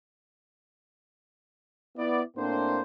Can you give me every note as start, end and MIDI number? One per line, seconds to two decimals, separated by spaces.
1.97 2.22 59
1.97 2.22 64
1.97 2.22 74
2.37 2.80 45
2.37 2.80 58
2.37 2.80 60
2.37 2.80 62
2.37 2.80 72